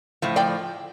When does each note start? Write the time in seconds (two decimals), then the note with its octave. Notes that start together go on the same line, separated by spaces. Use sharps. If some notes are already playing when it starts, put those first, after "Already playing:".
0.22 A2 F3
0.36 D5 G5